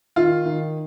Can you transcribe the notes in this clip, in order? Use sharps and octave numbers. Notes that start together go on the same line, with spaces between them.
D#3 F4
D#3